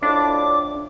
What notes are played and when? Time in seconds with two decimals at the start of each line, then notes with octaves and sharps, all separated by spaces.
0.03 F2 A2 D4 D6